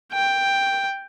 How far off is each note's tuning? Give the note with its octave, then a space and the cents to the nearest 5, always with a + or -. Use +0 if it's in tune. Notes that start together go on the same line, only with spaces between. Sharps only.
G5 +5